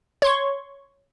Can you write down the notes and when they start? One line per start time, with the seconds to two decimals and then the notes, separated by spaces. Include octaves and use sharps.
0.22 C#5 C6 C#6